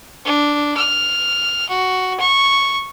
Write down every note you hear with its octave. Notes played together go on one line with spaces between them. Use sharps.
D4
F6
F#4
C#6